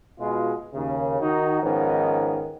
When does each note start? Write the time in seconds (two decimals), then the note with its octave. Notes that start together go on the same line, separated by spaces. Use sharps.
0.19 B2 G#3 F4
0.74 D#2 C#3
1.21 D#3 D#4 F#4
1.62 G#2 D#3 F3 B3 C#4 D#4